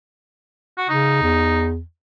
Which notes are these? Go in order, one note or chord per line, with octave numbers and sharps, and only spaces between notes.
F#4
C#3 D#4
E2